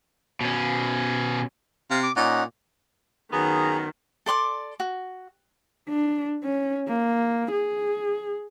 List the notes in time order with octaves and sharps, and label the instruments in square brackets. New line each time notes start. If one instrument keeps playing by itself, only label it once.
[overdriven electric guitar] B2 C#4
[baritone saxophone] C3 [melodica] F5
[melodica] D6
[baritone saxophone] A#2 [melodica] C#4 D#4 F#5
[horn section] F#2 F#3 B3 [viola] D#3 [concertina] G#4 A#5
[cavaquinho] A4 D5 C6 D6
F#4
[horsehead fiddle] D4
C#4
A#3
G#4